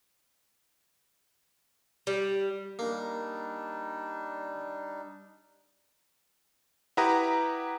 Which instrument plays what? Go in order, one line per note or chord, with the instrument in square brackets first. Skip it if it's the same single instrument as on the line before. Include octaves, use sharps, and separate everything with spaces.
[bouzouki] G3
[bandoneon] G3 D4 D#4 [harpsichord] A#3
[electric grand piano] E4 G4 B4 F#5 A#5 D#6